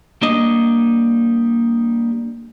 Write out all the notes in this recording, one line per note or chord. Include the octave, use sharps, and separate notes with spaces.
G3 A#3 D4 D#5